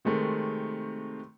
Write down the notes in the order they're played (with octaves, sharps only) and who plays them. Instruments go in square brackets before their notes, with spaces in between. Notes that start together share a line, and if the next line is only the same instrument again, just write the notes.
[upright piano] C3 D#3 G#3 A3 C4